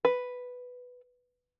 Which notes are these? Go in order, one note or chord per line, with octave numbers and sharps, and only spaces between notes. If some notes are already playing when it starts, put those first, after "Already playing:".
B4